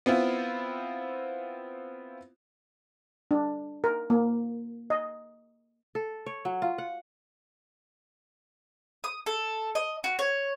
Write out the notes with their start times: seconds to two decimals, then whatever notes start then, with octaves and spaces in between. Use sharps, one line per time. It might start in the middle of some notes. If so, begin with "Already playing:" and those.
0.06 B3 C4 E4 F4
3.31 D4
3.84 A#4
4.10 A#3
4.90 D#5
5.95 A4
6.26 C#5
6.45 F#3
6.62 F4
6.78 F#5
9.04 D#6
9.26 A4
9.75 D#5
10.04 F#4
10.19 C#5